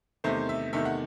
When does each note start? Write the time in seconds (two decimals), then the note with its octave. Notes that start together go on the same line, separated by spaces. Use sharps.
0.24 E2 C3 D#3 A3 C5
0.49 E5
0.73 E2 C3 D#3 A3 E5
0.85 F#5